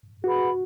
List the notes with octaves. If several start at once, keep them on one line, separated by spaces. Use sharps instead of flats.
F#4 G#4 B4 F#5 B5